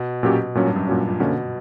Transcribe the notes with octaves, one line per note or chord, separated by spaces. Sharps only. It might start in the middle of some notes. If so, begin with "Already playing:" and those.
Already playing: B2
A#2 F#3 C#4 G4
G2 A#2 F#3 C#4
G2
F#2
A#2 F#3 C#4
A#2
B2 D3 A#3 C#4